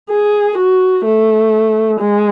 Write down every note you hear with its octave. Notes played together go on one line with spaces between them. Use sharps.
G#4
F#4
A3
G#3